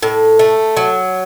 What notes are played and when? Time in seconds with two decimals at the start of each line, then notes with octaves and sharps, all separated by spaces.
0.03 A2
0.39 A3
0.77 F#3